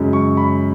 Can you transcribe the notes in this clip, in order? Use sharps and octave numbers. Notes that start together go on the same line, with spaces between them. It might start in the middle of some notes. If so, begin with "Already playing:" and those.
Already playing: F#2 C#3 G#3 C#4
C#6
B5